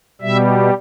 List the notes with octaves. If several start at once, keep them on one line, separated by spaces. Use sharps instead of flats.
B2 G3 E5